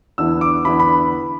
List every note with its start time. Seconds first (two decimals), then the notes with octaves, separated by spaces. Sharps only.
0.18 E2 D3 B3 E4 E6
0.41 D6
0.65 E2 D3 B3 E4 B5
0.80 B5